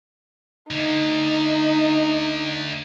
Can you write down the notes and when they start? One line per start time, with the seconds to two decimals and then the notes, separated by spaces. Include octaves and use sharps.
0.71 D2 D3 D#4